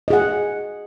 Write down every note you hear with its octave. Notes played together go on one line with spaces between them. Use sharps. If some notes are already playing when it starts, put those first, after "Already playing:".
G#4 D#5 F#5